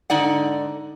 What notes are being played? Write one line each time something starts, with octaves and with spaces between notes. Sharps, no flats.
G#2 D3 D#4 D5 F#5